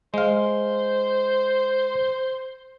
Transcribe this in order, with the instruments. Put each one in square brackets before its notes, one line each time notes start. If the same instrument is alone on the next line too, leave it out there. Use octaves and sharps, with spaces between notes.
[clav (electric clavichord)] G#3 F5 [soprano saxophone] C5